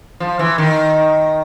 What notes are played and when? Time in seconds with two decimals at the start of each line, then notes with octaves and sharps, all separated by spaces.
0.20 F3
0.39 E3
0.58 D#3